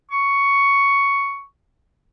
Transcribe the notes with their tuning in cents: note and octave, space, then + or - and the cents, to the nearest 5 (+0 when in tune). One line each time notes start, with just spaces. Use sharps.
C#6 +10